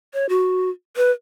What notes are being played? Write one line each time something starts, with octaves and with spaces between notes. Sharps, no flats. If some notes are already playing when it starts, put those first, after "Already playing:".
C#5
F#4
B4